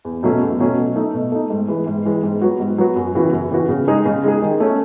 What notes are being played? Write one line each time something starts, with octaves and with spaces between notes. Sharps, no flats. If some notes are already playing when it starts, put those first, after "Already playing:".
E2
B2 F#3 A3 C#4
E2
B2 F#3 A3 C#4
B2
A3 D#4
B2
A3 D#4
G#2
E3 G#3
G#2
E3 G#3
G#2
F#3 B3 F#4
G#2
F#3 B3 F#4
F#2
C#3 E3 B3 F#4
F#2
C#3 E3 B3 F#4
C#3
G#3 D#4 G#4
C#3
G#3 D#4 G#4
D#3
A3 C#4